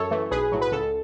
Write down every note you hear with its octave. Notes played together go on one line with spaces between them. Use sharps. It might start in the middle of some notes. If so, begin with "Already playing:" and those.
Already playing: F#2 A4 C#5
E3 A3
B1 G#4 B4
A2 F#3
B4
C#2 A4